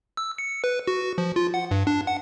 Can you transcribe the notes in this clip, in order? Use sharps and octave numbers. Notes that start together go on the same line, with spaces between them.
E6
C#7
B4
F#4
F3
F4
F#5
G2
D4
F#5